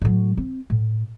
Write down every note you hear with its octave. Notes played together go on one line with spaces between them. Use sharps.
A2 F#3
C4
A2